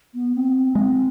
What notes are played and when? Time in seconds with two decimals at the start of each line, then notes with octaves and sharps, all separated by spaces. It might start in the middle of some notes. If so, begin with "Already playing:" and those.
0.14 B3
0.35 C4
0.75 G#3 C4